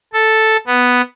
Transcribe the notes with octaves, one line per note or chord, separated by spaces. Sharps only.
A4
B3